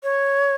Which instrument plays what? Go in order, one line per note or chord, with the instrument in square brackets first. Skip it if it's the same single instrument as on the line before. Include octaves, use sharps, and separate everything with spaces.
[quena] C#5